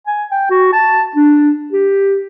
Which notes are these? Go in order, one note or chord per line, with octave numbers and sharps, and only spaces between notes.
G#5
G5
F#4
A5
D4
G4